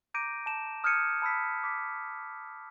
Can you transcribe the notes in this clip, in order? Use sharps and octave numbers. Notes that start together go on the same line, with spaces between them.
A#5 D6 G6 A#6 D7 D#7
A5 E7
D#6 F6 G6 G#6 C#7 D#7
A5 B5 E6 B6
D6 B6